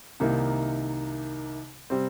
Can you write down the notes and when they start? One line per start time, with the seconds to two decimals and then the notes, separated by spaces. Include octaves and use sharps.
0.20 C2 C3 D#3 A#3 D#4
1.90 C3 G3 C4